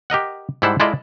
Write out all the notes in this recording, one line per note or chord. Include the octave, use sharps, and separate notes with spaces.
G4 A#4 D#5 F#5
G#2 G3 E4 C5 F#5 A5
G#3 E4 F4 A4 D5 D#5